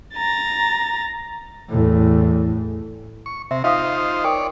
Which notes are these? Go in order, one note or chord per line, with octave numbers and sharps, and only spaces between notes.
A#5 A6
E2 A2
C#6
C3 E5
D#4 F4 C5 E5 F5 D#6
A#4 C#5 D5 G5 D#6